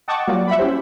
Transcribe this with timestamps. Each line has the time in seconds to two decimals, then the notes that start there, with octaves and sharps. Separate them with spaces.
0.08 D#5 F#5 G5 A5 C#6 D6
0.27 F#3 G3 A#3 F4 F#4 D5
0.47 E5 F#5 B5
0.59 C#4 E4 G4 C5